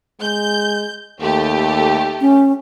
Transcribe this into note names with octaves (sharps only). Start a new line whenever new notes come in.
G#3 G6
D#2 A3 G4
C#4